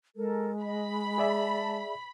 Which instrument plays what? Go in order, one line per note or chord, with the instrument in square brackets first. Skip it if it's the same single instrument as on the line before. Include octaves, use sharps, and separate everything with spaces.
[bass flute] G#3 [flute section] A4 A#4
[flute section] D#5 [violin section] B5
[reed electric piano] G#4 D5 E5 [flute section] A5